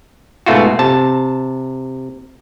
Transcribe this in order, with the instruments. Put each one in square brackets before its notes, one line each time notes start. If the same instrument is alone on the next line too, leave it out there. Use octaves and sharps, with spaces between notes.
[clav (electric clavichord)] G#2 B2 A3 F4 F#4
C3 A5